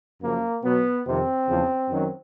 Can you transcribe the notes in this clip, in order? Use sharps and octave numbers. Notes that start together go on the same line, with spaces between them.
F#2 C#3 F3 A#3
B2 F#3 B3
F2 C3 D#3 C4
E2 C#3 F3
F#2 D#3 F#3